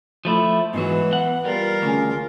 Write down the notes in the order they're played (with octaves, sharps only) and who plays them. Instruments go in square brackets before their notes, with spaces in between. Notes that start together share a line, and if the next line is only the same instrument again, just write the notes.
[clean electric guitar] F3 A3 E4
[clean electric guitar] G#2 F#3 [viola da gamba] E3 [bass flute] B3
[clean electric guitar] F#5
[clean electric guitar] G3 [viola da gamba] F4 A#4
[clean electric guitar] D2 [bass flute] C#3